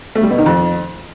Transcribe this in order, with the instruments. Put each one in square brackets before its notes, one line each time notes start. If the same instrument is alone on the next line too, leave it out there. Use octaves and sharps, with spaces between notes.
[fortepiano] A3
G3
B2
D#3
F2